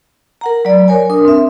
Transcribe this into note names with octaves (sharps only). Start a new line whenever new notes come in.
A#4 F#5 A#5
F#3 D5
A#4 C#5 G#5
D4 A#4 D#6
C4 E5